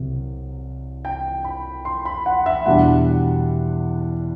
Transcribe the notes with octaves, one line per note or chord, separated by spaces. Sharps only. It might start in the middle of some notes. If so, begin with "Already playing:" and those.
Already playing: C2 C3 F#3
G5
B5
C6
B5
F#5
E5
E2 B2 G3 D4 F#5